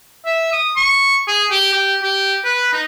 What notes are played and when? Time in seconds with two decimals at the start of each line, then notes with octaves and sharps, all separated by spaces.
0.26 E5
0.53 D#6
0.76 C#6
1.28 G#4
1.51 G4
1.73 G4
2.02 G4
2.45 B4
2.73 D#4